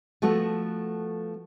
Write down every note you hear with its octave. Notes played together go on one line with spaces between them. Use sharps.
F3 A3 B3 F#4 A4